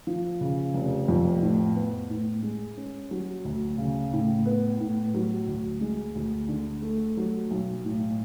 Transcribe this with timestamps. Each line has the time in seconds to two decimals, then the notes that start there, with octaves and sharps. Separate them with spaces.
0.07 F3
0.41 C#3
0.74 F1
1.08 F2
1.42 A2
1.75 B3
2.10 A2
2.43 G#3
2.77 C#4
3.11 F#3
3.45 D2
3.78 C#3
4.13 A2
4.46 B3
4.80 A2
5.14 F#3
5.47 D2
5.81 G#3
6.15 D2
6.48 D3
6.82 A3
7.17 F#3
7.51 B1
7.85 A2